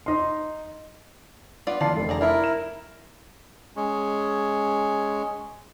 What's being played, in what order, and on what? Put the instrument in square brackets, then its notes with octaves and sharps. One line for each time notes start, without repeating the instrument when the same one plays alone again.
[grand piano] D#4 C6
[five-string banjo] B3 F4 D5
[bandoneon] F2 F3 F4 [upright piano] E3 A5 C7 [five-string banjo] D5
[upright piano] F1 [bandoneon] A4
[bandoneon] D3 [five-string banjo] G#4 D5 A#5
[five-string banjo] D4 F4 E5 [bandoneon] E4 A#4
[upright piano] E7
[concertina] G#3 C#4